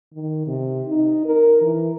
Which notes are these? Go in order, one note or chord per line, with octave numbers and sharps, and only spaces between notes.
D#3
C3
D#4
A#4
E3